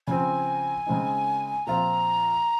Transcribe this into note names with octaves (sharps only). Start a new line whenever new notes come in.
C#3 F3 C4 G#5
C#3 G#3 C4 D#4
A#2 F3 C4 F4 A#5